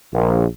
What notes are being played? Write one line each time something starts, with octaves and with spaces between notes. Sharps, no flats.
A#1